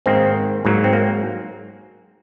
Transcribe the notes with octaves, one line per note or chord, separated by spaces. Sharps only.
G#2 D#3 A#3 C4
G#2 F#3 A#3
C4
A#3